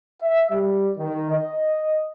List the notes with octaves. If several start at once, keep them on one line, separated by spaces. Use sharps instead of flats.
E5
G3
D#3
D#5